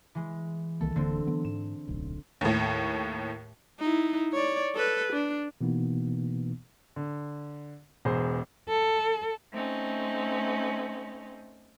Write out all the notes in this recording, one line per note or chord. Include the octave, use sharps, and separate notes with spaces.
E3 G#3
C2 D#3 A#3 A4
D1 D3 A#3 C4
E3 F#3 B3
G#2 E7
D1 B1
D#2 A2
D#4 E4
C#5 D5
A4 B4
D4
B2 E3 A#3 B3 D#4
D3
E1 E2 G#4 C5
A4
A3 C4 C#4 D#4